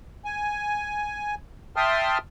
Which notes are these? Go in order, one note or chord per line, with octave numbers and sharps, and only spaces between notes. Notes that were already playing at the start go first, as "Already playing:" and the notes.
G#5
E5 G5 A5 C6 D#6 F6